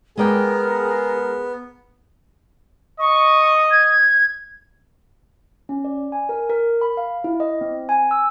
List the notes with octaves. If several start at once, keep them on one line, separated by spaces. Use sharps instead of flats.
G#3 B3 G#4 A#4 D5 G5
D#5 C#6
G#6
C#4
D5
G#5
A#4
A#4
B5
F5
E4
D#5
C4
G#5
E6